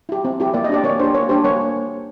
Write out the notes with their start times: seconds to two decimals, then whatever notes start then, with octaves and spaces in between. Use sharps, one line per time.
0.09 E4 G4
0.25 C4
0.40 E4 G4
0.54 A#3 D5
0.64 D#5
0.69 D4 G4 D5
0.84 A#3 C#5
0.99 D4 G4 C5
1.14 A#3 C#5
1.29 D4 G4 C5
1.44 A#3 C#5